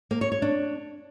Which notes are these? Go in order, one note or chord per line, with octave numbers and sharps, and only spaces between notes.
A#3
C#5
C#5
D4